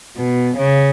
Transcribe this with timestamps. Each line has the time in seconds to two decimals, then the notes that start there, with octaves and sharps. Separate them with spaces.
0.16 B2
0.59 C#3